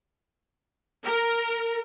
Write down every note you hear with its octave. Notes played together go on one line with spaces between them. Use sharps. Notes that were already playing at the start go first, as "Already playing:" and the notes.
A#4